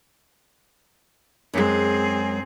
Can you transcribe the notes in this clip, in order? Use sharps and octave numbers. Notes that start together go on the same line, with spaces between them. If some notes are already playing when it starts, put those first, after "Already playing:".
F#2 G#3 C4 G#4